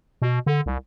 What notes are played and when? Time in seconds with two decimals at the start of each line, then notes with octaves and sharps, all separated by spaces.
0.22 B2
0.46 D3
0.66 C2